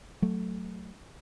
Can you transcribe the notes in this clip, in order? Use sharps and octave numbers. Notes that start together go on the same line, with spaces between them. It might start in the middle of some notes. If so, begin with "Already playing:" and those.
F#3 A3